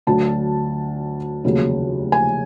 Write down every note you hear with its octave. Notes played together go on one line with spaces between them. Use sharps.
D2 D3 F#3 A5
F1 D#2 C#3 F#3
G#5